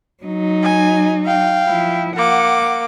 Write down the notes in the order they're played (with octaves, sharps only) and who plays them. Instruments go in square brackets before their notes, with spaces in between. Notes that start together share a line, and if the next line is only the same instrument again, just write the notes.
[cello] F#3 D#4
[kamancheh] G#5
F5 G5
[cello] F3 E4
[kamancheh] A#3 D6 [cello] F#5